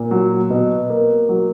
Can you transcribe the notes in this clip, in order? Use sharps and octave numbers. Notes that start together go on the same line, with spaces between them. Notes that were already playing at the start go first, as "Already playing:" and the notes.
Already playing: A#2
F#3
B2
A#3
F#3